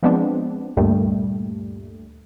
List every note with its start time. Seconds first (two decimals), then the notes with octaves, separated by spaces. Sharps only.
0.03 F3 G#3 B3 C4 D4
0.77 D2 G2 A#2 G3 A3